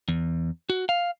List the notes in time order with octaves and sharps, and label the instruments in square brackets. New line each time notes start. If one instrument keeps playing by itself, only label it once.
[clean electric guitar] E2
F#4
F5